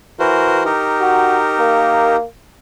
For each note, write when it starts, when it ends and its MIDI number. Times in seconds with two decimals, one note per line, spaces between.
0.20 0.71 52
0.20 0.63 66
0.20 0.63 70
0.20 0.63 72
0.65 2.16 63
0.65 2.16 67
0.65 2.16 70
1.01 1.38 66
1.58 2.25 58